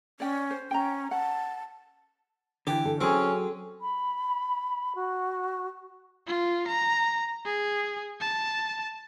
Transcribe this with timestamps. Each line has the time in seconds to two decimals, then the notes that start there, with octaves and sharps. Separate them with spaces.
0.20 C#4 D5 G5
0.51 C5
0.71 C#4 G5 A#5
1.11 F#5 A5
2.67 D3 E3 G4
2.85 A4
3.01 F#3 C4 C#4 G#4
3.81 B5
4.95 F#4
6.27 F4
6.68 A#5
7.45 G#4
8.21 A5